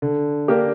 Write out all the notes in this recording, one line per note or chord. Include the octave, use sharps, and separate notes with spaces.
D3
A#3 D4 G4 A#4